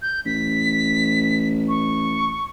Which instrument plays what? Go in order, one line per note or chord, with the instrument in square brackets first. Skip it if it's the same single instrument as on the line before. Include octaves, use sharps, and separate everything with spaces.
[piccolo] G6
[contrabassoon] A1 [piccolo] B6
[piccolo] C#6